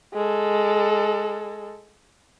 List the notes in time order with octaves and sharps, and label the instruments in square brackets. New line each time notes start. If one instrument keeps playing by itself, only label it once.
[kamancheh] G#3 A4